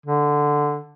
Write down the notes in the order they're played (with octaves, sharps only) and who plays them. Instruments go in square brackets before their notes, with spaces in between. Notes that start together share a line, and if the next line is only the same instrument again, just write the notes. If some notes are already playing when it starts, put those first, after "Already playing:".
[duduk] D3